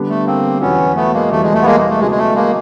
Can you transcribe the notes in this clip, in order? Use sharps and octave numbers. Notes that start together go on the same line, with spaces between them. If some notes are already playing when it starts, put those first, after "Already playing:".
Already playing: D3 G3 B3 D4
A3
A#3 C4
E2 B2 F#3 B3 C#4
A3 B3
G#3 A#3
E2 B2 G3 A3
G#3
A3
B3
G#3 A#3
A3
C#3 F#3 G#3 B3
G#3
A3
G#3 A#3